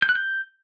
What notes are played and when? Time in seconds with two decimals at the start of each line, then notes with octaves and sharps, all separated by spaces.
0.02 G6
0.09 F#6
0.15 G6